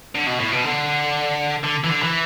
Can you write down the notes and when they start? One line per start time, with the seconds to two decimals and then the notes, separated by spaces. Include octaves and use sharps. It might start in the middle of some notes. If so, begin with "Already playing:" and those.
0.15 D3
0.27 B2
0.40 A2
0.52 B2
0.64 D3
1.64 D3
1.84 E3
1.89 D3
2.02 E3